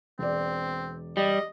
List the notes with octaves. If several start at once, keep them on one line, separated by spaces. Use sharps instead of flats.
E1 C4 D5
G3 D#5